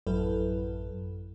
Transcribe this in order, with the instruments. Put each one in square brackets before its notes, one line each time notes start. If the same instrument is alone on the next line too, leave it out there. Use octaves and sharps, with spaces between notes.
[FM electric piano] A1 F#2 F#3 E4 A4 B4